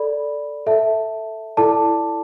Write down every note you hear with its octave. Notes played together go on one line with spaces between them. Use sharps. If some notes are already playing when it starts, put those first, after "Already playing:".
Already playing: A4 D5 B5
A4 E5 A5
E4 A4 D5 A5 D6